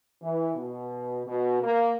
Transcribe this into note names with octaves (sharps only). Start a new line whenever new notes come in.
E3
B2
B2
A#3